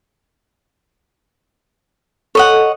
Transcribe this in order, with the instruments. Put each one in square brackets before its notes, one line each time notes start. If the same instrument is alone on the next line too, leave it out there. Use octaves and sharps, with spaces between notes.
[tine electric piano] A4 [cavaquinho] C#5 D#5 F#5